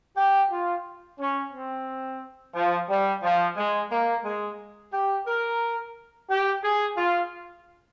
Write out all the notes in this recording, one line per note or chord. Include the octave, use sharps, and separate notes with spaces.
G4
F4
C#4
C4
F3
G3
F3
G#3
A#3
G#3
G4
A#4
G4
G#4
F4